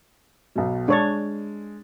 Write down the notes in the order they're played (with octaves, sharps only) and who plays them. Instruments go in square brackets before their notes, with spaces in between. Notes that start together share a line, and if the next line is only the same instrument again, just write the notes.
[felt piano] B1 B2
[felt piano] G#3 A6 [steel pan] D4 C#5